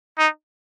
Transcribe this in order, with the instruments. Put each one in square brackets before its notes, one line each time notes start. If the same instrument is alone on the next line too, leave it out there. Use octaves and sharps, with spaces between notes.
[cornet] D#4